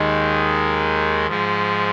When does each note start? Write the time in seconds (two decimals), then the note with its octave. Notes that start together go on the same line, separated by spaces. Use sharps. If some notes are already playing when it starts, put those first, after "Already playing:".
Already playing: D#2 D#3 G#3
1.28 G#2 F3 G#3